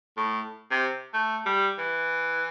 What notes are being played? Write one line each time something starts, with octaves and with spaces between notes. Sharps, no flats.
A2
C3
A3
G3
E3